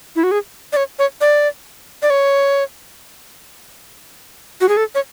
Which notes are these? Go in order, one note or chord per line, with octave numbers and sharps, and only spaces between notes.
E4
F#4
G#4
D5
C#5
C#5
D5
D5
C#5
F#4
G#4
A4
C#5